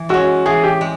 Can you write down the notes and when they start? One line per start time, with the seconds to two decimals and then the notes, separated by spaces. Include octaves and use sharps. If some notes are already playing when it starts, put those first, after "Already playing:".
Already playing: E3
0.09 G#3 C#4 F#4
0.46 E3 G#4
0.64 G4
0.81 G#3